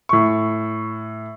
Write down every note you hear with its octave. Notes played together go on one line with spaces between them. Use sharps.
A2 C#6